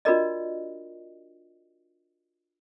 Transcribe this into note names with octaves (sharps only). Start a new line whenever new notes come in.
D4 F4 F#4 A#4 D5 D#5